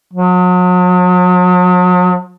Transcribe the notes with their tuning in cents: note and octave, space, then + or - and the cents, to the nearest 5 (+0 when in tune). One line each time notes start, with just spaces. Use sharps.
F#3 -40